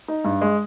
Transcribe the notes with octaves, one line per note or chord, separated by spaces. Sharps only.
D#4
G2
G#3